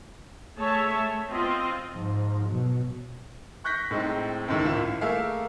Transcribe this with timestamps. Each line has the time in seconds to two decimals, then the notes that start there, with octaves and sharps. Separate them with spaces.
0.58 A3 G#4 C#5 E5 A5
0.97 A3
1.31 C4 F4 D#5
1.94 G#2 F3
2.48 B2 F#3
3.64 C#6 F#6 G6 A#6 B6
3.91 A2 G#3 C4 D#4
4.48 C#2 A2 D#3
4.65 G#1 E4 F4 E7
5.01 A3 A#3 G#4 A#4 E5 F5